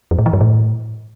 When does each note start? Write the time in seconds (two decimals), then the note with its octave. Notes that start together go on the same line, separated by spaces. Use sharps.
0.11 F2
0.19 A2
0.26 E3
0.33 G2
0.41 A2